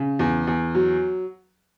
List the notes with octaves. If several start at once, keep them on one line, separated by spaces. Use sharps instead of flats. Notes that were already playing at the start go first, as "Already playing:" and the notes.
Already playing: C#3
E2
E2
F#3